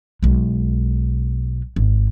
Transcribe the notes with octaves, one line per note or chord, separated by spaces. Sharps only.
B1 G#3
G#1